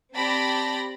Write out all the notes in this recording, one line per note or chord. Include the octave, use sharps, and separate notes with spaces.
C4 G4 D5 A5 B5 A#6